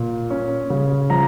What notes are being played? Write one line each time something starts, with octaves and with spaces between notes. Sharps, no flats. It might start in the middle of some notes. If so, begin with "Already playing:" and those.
Already playing: A#2
C#4
C#3
F3 A#5